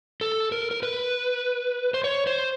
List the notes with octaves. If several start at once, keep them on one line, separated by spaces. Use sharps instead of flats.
A4
A#4
A#4
B4
C5
C#5
C5